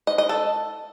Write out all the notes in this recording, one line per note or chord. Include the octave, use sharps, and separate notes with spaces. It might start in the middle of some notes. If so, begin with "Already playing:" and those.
D#5
D#5
A4